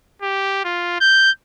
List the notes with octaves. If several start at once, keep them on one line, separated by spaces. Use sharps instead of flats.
G4
F4
G6